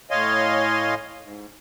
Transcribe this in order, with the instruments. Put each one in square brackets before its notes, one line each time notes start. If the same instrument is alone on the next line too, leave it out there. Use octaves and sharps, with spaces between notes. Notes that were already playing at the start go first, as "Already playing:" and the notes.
[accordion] A2 C#5 D#5 F5 G#5 C6
G#2